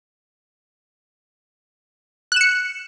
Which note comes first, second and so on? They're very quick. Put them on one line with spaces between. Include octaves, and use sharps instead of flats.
F#6 E7 C#7